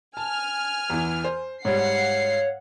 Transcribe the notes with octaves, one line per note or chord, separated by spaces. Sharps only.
G#5 A5 F6
E2 E3
C5
G#2 G3 C#5 F5 F#5 C7